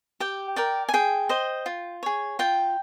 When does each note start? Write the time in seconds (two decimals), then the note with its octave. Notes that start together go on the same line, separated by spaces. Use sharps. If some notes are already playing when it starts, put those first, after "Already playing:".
0.20 G4 G5
0.56 A#4 D5 G5
0.89 G#5
0.94 G#4 G5
1.29 C5 D#5
1.66 F4
2.03 G#4 C#5
2.39 F4 G5